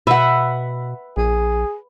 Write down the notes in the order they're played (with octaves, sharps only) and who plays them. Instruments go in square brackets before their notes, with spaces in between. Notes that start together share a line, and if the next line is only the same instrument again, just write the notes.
[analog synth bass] B2 [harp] B4 [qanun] E5 F#5
[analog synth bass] A#1 [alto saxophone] G#4